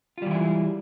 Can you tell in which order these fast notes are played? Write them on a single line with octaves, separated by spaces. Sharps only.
F4 G3 E3 E4 G#3